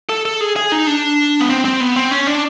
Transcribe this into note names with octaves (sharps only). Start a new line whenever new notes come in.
A4
A4
G#4
G#4
D#4
D4
B3
C4
C4
B3
C4
C#4
D4